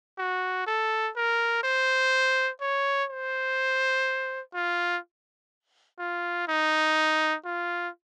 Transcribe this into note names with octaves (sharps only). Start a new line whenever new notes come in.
F#4
A4
A#4
C5
C#5
C5
F4
F4
D#4
F4